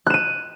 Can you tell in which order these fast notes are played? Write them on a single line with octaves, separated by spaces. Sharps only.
F#6 E7 D#7